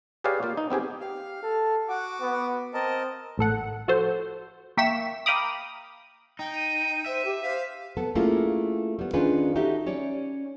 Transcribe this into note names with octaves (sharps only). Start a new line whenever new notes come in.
G4 G#4 B4 C#5 D5 F5
A#3 F4
D#4
B3 C4 G4 G#4
G4 F5
A4
F#4 F#5 D6
B3
C4 A#4 D#5 A5
A1 A2 A4 F#5
F3 F#4 A4 C5
A#3 E5 G5 C#6 B6 E7
F5 G5 A#5 B5 D6 D#6
D#4 G5
D#7
C5 E5
G4
C5 F5 B6
B3 A4
A3 A#3 C#4 E4 F4 G#4
G3 B3
D#3 C#4 D4 F4 G#4 B4
D#4 F#4 G4 A4 E5
C#4 C#5 D5